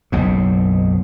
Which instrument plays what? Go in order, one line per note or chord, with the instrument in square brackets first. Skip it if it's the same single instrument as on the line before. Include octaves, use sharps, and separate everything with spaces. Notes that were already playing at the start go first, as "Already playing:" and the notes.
[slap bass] F#1 B1 G#2